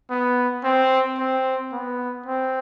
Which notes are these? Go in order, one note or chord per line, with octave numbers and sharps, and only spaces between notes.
B3
C4
C4
B3
C4